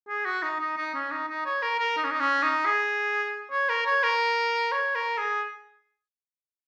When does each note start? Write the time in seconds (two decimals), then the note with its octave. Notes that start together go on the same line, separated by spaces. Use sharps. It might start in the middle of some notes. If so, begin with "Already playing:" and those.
0.08 G#4
0.26 F#4
0.43 D#4
0.60 D#4
0.77 D#4
0.94 C#4
1.11 D#4
1.28 D#4
1.46 C#5
1.62 A#4
1.79 A#4
1.97 D#4
2.04 C#4
2.11 D#4
2.20 C#4
2.43 D#4
2.66 G#4
3.52 C#5
3.69 A#4
3.86 C#5
4.03 A#4
4.72 C#5
4.95 A#4
5.18 G#4